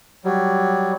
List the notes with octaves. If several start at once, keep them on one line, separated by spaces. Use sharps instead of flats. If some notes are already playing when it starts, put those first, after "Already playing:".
F#3 G3